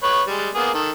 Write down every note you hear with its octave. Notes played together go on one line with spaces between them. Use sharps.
B4 C#5
G3 G#3
A#3 B3 G#4
D#3 A4